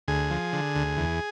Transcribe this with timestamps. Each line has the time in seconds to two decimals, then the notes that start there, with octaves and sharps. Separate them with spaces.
0.08 D2 G#4
0.30 F3
0.53 D3
0.75 D2
0.97 E2